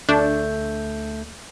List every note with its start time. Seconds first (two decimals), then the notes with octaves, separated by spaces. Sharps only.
0.09 D2 A3 D4 G6